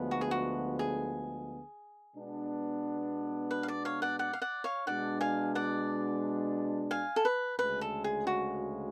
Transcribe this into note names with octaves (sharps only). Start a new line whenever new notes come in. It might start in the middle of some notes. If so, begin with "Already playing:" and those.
Already playing: D2 D3 F3 G#3 B3
F#4
G#4
F#4
G#4
B2 G#3 B3 D4
B4
F5
D5
C#5 F5
D5 F#5
D5 F#5
F5
D5 F#5
C#5 F5
B2 G#3 D4 D5 F#5
F5 G#5
D5 F#5
F5 G#5
A4
B4
D2 C#3 G#3 B4
A4
G#4
F#4